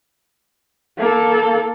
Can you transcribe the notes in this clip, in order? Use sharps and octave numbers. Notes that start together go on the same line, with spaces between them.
A#3 A4